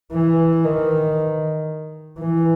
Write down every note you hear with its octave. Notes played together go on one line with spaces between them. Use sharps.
E3
D#3
E3